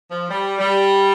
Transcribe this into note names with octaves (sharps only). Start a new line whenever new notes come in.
F3
G3
G3